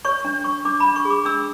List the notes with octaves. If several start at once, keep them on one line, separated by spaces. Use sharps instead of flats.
C#5 C#6
D4
C#5 C#6
D4 D6
D4 B5
C#6
G#4
D6
D4 E6